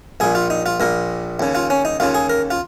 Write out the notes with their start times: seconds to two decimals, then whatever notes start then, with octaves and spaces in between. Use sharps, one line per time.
0.20 A#1 A#2 G#4
0.35 F4
0.50 D#4
0.66 F4
0.80 A#1 A#2 A#4
1.40 D#2 C#3
1.55 F4
1.70 C#4
1.85 D#4
2.00 D#2 C#3 F4
2.14 G#4
2.30 A#4
2.51 F4